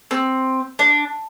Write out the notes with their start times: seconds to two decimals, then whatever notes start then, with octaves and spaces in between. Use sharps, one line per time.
0.11 C4
0.79 D4